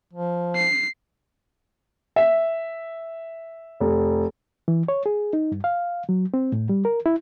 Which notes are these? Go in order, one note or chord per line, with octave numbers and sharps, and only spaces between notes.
F3
C7
E5
F1
E3
C#5
G#4
D#4
G2
F5
F#3
C4
A2
G3
A#4
E4